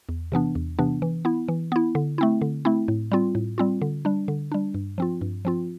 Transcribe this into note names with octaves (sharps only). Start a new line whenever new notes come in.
E2
C3 E3 B3 D4
E2
C3 E3 B3 D4
E3
B3 E4
E3
B3 E4
D3
A3 C4 E4
D3
A3 C4 E4
A2
G3 C4 F4
A2
G3 C4 F4
D3
G3 D4
D3
G3 D4
G2
F3 C4 F4
G2
F3 C4 F4